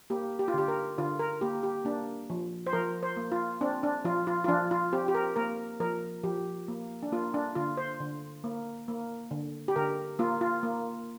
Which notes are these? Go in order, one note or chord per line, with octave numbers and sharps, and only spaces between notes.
A#3 G4
G4
F4
D3 G4
A#4
D3 F4
A#4
A#3 G4
G4
A#3 D4
F3
C5
F3 A#4
C5
A#3
F4
C4 D4
D4
F3 F4
F4
F4
F3 D4
F4
C4 G4
G4
A#4
A#3 A#4
F3 A#4
F3 G4
A#3
D4
A#3 F4
D4
D3 F4
C5
D3
A#3
A#3
D3
G4
D3 A#4
A#3 F4
F4
A#3